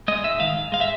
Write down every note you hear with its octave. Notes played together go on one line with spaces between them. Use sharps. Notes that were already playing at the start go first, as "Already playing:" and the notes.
G#3 D#5
G#2 E5
D#3 F5
G#2
G#3 F5
E5